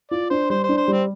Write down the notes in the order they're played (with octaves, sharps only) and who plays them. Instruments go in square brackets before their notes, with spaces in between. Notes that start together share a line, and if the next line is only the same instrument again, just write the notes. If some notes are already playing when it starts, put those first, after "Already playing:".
[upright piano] F4 [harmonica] D5
[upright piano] D4 [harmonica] C5
[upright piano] G3 [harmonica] C5
[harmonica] C5
[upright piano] D4
[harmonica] C5
[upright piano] G3 [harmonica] C4